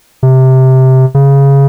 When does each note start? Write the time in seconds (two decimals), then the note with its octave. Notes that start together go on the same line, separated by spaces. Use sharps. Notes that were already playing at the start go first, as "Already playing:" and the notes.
0.23 C3
1.14 C#3